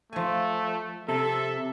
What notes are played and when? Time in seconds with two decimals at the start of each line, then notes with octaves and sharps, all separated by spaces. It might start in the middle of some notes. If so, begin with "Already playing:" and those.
0.13 F3 A3 G#5
1.09 C3 A4 E5